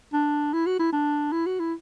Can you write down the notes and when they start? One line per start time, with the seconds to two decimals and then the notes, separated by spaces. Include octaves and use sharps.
0.13 D4
0.53 E4
0.66 F#4
0.79 E4
0.93 D4
1.32 E4
1.46 F#4
1.59 E4